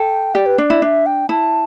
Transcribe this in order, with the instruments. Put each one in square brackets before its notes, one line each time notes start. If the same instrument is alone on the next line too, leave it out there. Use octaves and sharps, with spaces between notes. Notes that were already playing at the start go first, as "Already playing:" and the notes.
Already playing: [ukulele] A4 [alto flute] G5
[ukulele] G4 [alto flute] D5
[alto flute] B4
[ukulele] D4 [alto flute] D5
[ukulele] E4
[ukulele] D4 [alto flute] E5
[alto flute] G5
[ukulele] E4 [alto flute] A5